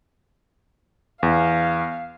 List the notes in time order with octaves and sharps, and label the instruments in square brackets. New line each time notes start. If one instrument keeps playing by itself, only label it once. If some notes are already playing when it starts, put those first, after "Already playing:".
[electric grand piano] E2 [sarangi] F5